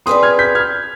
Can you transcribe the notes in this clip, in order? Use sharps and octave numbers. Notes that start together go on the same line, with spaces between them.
C4 F4 G#4 B4 D5 C6 D#6
F6 G#6
G6 B6
F6 G#6